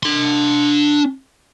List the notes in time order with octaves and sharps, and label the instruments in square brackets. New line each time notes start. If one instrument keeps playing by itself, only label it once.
[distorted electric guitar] D4 C6